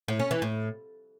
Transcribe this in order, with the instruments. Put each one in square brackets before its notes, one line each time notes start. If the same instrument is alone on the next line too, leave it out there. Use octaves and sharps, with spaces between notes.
[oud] A2
C#4
E3
A2